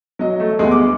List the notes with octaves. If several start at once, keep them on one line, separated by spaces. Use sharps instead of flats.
F#3 D#5
A3
D2 G3 G#3 B3
D6